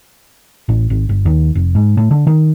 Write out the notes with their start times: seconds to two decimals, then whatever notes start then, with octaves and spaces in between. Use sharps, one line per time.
0.69 A1
0.90 G#1
1.09 G1
1.25 D#2
1.55 F1
1.75 G#2
1.97 A2
2.11 D3
2.27 D#3